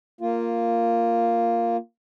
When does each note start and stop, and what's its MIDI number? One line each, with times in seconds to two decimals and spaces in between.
0.21 1.77 58
0.21 1.77 65